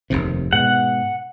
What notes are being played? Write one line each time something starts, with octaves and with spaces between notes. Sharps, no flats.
F1 D#2 C3
G#2 B2 F#5